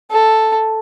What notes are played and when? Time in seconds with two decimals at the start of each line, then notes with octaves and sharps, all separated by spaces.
0.11 A4